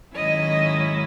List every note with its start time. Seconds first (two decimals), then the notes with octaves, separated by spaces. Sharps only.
0.15 G#2 D#3 F#3 C#4 E4 D#5